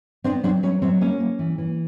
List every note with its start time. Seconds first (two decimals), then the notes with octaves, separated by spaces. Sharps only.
0.24 B3 C4 D4
0.43 F#3 C4 D4
0.63 F#3 C#4
0.82 F#3 C4
1.01 A#3 C#4
1.20 A#3
1.39 E3
1.58 E3